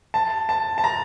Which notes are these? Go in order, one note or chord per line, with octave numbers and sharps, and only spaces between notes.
A5
A5
A5
A#5